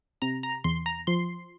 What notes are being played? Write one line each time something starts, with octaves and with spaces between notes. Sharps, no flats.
C3 A#5
A#5
E2 C6
A#5
F3 C6